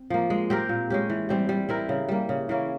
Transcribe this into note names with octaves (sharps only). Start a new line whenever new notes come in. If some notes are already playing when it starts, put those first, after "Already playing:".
Already playing: C4
F3 A#3
G#3
C4 G4 A#4
A#2
G#3 C#4 G4
E3
G3 C4 G4
G3
C4 E4 A#4
C#3
G3 A#3
C#3
E3 A#3 C#4